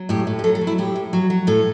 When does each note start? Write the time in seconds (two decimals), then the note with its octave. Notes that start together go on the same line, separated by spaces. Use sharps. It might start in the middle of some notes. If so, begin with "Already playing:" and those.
Already playing: F#3
0.09 A2 G4
0.27 A2
0.39 G4
0.44 F#3 A4
0.55 A4
0.61 F#3
0.67 E4
0.78 A2 G4
0.96 A2
1.13 F#3
1.30 F#3
1.47 A2 A4